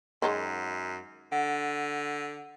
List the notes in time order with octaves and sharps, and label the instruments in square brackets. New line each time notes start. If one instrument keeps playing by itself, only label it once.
[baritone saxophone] F#2 [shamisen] D#3 F#3 G#3
[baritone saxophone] D3 [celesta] F#5